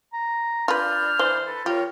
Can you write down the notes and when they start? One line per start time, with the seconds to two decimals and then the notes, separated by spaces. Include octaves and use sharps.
0.13 A#5
0.68 D4 F4 B4 B5 F6 G6
1.19 E3 C5
1.45 A4 B4
1.66 F4 G4 A#4 C#5